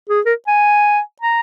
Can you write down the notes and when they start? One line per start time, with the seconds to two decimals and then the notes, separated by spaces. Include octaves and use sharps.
0.09 G#4
0.26 A#4
0.47 G#5
1.21 A#5